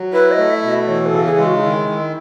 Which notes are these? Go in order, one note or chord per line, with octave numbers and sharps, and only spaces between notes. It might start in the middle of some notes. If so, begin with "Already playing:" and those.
Already playing: F#3
E4 B4
D#5
A3
E5
B2
D#5
E3 C#5
A4
C#3
G#4
G#3
F#4
D#4
D#3 E4
D#3